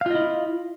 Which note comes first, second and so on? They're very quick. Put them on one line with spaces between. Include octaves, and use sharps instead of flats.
F5 F4 D#5 E4